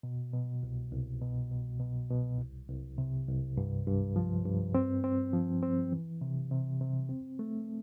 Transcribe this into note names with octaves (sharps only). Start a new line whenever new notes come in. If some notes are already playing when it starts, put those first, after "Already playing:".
B2
B2
C2
C2
B2
B2
B2
B2
C2
C2
C3
C2
G2
G2
F3
G2
C4
C4
F3
C4
E3
C3
C3
C3
C4
A3